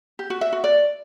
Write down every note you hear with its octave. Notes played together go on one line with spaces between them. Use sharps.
G4
F#4
E5
F#4
D5